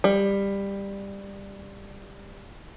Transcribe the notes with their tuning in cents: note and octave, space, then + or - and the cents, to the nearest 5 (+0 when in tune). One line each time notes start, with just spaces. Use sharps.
G3 +15